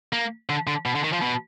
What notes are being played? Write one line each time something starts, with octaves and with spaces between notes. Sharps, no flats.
A#3
D3
D3
B2
D3
D#3
F3
B2